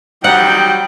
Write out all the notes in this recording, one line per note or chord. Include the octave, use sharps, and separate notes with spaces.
F#3 G3 D#4 F#5 G5